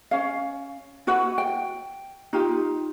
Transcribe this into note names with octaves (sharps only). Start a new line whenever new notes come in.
C#4 F5
E4 F#4 B4 F#5
G5
D#4 F4 G4